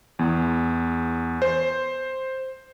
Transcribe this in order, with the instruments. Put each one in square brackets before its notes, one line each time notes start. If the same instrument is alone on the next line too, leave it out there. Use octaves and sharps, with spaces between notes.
[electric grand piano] E2
C5